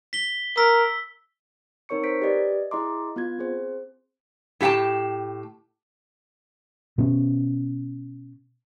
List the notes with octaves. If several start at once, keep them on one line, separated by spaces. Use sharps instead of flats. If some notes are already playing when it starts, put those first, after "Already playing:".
B6 G7
A#4 E6 B6
C4 D#4 A#4 C#5 C#6 C#7
A#4 C5 G6 B6 D7
G4 B4 D5 D#5
E4 G#4 D#5 A#5 C6 D6
B3 F4 G#6
C4 G#4 C5
A2 G4 F5 G5 A5
B2 B3 C#4